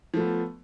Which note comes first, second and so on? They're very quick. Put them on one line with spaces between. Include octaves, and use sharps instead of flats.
F3 A3 B3